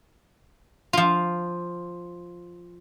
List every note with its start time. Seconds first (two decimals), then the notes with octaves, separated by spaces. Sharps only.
0.93 F3 F4